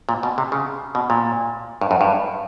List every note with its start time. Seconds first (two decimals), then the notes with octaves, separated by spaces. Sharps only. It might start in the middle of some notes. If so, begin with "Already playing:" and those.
0.09 A#2
0.23 B2
0.38 C3
0.52 C#3
0.95 B2
1.10 A#2
1.81 G2
1.91 F#2
2.01 G2